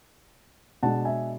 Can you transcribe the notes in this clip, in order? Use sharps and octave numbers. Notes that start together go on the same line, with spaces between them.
B2 G#3 D4 F#5 A5
E5 G#5